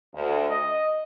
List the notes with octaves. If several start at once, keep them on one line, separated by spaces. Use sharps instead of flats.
D2
D#5